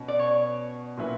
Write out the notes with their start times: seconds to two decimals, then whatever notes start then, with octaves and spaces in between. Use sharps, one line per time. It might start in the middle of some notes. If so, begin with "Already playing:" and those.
Already playing: B2 C#4
0.08 D5
0.19 C#5
0.97 A#2 F#3 C#4 E4 B4